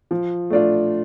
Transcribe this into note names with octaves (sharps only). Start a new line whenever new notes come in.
F3
A3 D4 F4